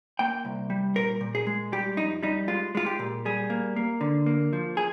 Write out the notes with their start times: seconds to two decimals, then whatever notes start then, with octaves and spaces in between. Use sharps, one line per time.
0.19 A#3 G5
0.45 C2
0.70 G3
0.95 A#2 A#4
1.21 A#2
1.35 G#4
1.47 G#3
1.72 G3 G4
1.97 F2 D#4
2.23 G3 D#4
2.48 G#3 F4
2.75 G#3 F4
2.86 G4
2.99 A#2
3.25 G3 G#4
3.50 A#3
3.76 A#3
4.01 D3
4.26 A#3
4.53 F3
4.77 G#4